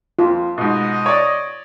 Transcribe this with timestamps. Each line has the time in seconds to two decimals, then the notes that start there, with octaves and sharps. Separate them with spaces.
0.19 F2 F4
0.58 G#2 B2 D#5
1.06 C#5 D5